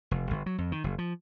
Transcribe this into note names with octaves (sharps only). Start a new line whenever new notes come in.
F1
G1
F#3
F2
D#3
F#1
F3